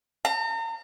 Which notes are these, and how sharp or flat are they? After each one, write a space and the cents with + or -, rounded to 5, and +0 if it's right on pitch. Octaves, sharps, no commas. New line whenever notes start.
A#5 -40